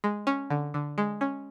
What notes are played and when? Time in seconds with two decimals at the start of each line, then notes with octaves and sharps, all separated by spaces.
0.04 G#3
0.27 C#4
0.50 D3
0.74 D3
0.98 G#3
1.21 C#4